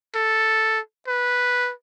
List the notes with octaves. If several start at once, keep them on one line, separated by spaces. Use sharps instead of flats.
A4
B4